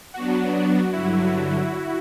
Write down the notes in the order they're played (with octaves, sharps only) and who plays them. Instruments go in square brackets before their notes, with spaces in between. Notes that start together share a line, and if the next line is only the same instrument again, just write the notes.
[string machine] F#3 B3 D4 [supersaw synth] F#4
[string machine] G2 D3 F#3 [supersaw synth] E4